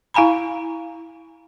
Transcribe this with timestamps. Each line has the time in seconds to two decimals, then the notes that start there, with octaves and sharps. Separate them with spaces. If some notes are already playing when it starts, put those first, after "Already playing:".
0.14 E4 F5 G#5 A#5 B5